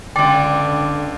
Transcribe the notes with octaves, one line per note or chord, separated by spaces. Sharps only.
C#2 D3 D5 G5 C6 D6